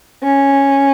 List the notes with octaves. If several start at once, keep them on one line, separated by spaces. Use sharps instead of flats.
C#4